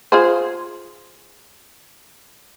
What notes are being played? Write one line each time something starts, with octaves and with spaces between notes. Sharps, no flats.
F4 G#4 C5